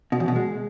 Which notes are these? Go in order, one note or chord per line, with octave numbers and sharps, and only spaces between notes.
B2
E2
B2
G#3